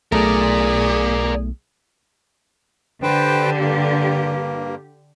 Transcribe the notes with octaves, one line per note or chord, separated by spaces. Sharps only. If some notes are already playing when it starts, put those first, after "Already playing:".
B1 A3 G#4 A#4 D5
D3 G4 B4 C5 G5
G2 A#3